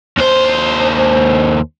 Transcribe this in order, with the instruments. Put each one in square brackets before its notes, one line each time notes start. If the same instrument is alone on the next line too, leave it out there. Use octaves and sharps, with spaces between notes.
[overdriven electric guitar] D#2 C5